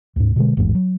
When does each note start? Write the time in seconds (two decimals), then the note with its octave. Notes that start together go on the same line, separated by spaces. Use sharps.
0.16 D2 G#2
0.36 B2 D3 G#3
0.57 A1 E2 G#2
0.75 F#3